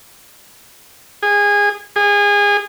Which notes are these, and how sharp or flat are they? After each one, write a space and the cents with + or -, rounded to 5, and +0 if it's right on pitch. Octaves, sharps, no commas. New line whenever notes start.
G#4 -20
G#4 -25